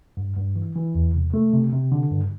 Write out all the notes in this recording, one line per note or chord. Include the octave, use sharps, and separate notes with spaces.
G2
G2
E3
E3
E2
C3
A3
C3
C3
D3
G2